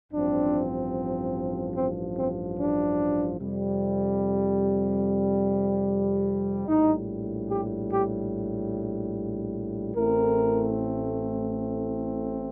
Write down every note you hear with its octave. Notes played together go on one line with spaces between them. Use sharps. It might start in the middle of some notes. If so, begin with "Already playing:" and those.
A1 G2 F3 C4 D4
C4
C4
D4
F2 C3 G3
A#1 A2 G3 D#4
G4
G4
A1 A2 A3 C4 A#4